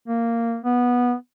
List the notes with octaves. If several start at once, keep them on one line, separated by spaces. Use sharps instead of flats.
A#3
B3